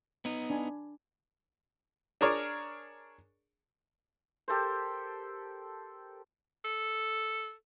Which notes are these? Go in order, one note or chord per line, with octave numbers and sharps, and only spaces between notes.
B3 D#4
D4 G#5 B5
D4 G#4 A#4 C#5 D5
G4 A4 A#4 C5
A4